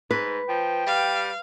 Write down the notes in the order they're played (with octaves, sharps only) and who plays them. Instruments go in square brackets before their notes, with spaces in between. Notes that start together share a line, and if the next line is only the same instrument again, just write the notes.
[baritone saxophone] G#2 [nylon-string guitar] B4
[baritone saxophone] F3 [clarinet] G5
[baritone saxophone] G3 [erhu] F5